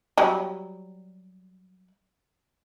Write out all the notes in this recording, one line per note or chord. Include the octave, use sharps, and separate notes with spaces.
F#3 G3